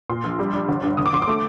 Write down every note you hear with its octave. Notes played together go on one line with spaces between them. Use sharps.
A#2 C6
A#1
G3
D4
G1
G2
D3 D#6
D6
G1 C6
D6
A3